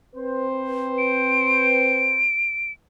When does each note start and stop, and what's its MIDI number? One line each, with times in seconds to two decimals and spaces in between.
0.15 2.29 60
0.15 2.29 71
0.15 2.29 72
0.98 2.72 98